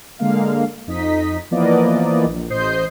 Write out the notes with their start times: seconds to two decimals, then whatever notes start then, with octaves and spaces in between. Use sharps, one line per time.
0.19 D3 G#3 A#3 F5
0.87 F2 D#4 D#5 B6
1.51 E3 F3 A#3 B3 D5 D#5
2.26 A#1
2.50 A1 C5 D#5 D#6 G6 C7